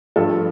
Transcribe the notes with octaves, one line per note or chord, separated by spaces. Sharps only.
G2 F3 A3 A4